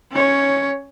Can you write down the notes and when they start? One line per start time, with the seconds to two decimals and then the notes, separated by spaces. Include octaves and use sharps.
0.12 C#4 C#5